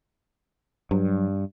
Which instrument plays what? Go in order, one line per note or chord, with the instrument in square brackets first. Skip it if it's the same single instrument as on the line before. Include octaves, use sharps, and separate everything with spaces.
[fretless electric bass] G2 [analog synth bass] F#3